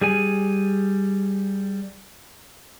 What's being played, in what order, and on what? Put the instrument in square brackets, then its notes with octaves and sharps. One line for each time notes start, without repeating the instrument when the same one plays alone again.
[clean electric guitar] G3 G#4 G#5